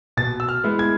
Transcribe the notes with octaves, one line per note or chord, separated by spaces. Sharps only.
B2 A6
E6
F6
G#3 B3 E4
G#6